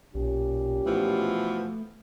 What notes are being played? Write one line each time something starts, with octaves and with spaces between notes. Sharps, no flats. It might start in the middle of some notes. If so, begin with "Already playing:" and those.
B1 A#2 C#4 G4
B2 E3 F3 A3